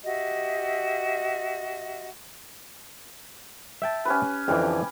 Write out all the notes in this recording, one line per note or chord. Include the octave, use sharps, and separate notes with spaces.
F#4 G4 D#5 E5
E5 G5 A5
C#4 G4 B4
F2 D3 E3 G4